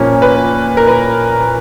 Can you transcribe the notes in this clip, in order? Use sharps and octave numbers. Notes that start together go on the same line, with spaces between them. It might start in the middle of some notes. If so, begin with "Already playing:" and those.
Already playing: A#2 F3 A#3 C#4
B4
A#4
B4